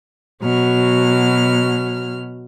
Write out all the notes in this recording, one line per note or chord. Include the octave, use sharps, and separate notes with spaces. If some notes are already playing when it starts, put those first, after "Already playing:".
B2 F#3 F6